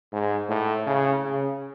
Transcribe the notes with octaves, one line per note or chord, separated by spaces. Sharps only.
G#2
A2
C#3
C#3